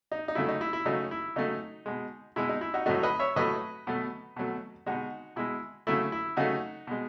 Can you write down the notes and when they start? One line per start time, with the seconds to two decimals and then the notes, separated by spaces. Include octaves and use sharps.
0.12 D#4
0.28 D#4
0.35 C#3 F#3 A3 E4
0.49 D#4
0.61 E4
0.73 E4
0.86 C#3 F#3 A3 D#4
1.11 E4
1.36 C#3 F#3 A3 D#4
1.86 B2 G#3
2.36 B2 G#3 E4
2.49 D#4
2.61 E4
2.74 D#4 F#4
2.86 A2 F#3 A3 D#4 F#4
3.03 B4 D#5
3.19 C#5 E5
3.36 A2 F#3 A3 B4 D#5
3.87 B2 F#3 A3
4.36 B2 F#3 A3
4.86 B2 G#3 D#4 F#4
5.36 B2 G#3 E4
5.87 C#3 F#3 A3 E4
6.12 E4
6.37 C#3 F#3 A3 D#4 F#4
6.87 B2 G#3